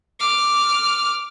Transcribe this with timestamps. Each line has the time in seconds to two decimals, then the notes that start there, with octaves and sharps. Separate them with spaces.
0.19 D6 F6